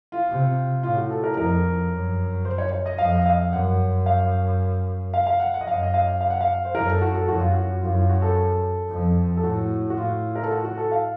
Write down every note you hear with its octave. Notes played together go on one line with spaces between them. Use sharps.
F4
C3
A2 F4
F#4
A4
A#4
F2 A#4
F#2
C5
C#5
C#5
D#5
F2 F5
D#5
F5
F#2 F#5
F5
F5
F5
F#5
F#5
D#5
F#2 F5
D#5
F5
F5
F#5
F5
C5
F#2 A#4
A4
F#4
A4
F#2 F#4
F4
F#4
F#2 F4
F4
F#4
A4
F2
A4
A2 F#4
F#4
A2 F4
A#4
A4
F#4
F#4
A4
F5